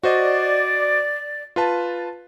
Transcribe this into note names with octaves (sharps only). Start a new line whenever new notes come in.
F#4 C5 D5 D#5
F4 B4 A5